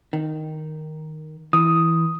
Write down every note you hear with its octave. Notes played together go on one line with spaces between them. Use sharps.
D#3
E3 D#6